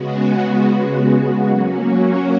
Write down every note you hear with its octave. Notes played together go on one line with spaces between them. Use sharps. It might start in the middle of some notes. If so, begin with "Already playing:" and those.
Already playing: C#3 G#3 B3 F#4
F#3 A#3 C#4 F#4